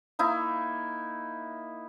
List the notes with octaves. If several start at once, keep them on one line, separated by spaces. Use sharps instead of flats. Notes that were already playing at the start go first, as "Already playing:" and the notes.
A#3 D#4 E4